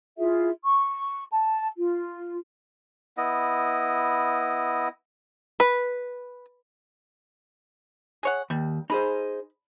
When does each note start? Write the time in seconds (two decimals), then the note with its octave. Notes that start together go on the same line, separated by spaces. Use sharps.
0.18 E4 F4 G#4 E5
0.64 C#6
1.31 A5
1.77 F4
3.17 B3 E4 D#5
5.60 B4
8.23 G#4 C#5 F#5
8.50 D#2 G3
8.90 D#4 G#4 C5 B5